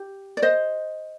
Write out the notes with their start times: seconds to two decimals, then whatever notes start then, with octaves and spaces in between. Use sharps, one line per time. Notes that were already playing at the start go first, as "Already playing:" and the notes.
Already playing: G4
0.37 D5
0.42 C5 D#5